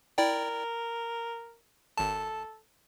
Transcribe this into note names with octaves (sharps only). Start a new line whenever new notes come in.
E4 A#4 D5 G5
G#1 A4 A5